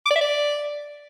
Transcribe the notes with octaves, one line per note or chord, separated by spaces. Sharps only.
D6
D5
E5
D5